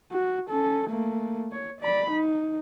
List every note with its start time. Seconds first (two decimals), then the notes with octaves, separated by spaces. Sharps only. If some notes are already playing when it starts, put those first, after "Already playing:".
0.12 F#4
0.50 C#4 A4
0.90 A3 A#3
1.52 C#5
1.81 D5 B5
2.11 D#4